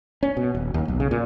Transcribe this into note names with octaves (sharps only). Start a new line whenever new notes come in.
C#4
B2
D#1
D#2
B1
C#3
A#2